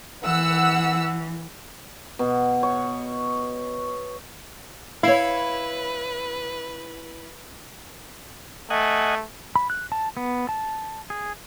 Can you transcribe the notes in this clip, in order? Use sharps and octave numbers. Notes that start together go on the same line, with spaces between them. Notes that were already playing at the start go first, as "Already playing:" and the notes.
E3 F#5 E6
B2
C#5
E4 B4 C#5 F5
A3 D#5 F#5 G#5
B5
F#6
A5
B3
A5
G#4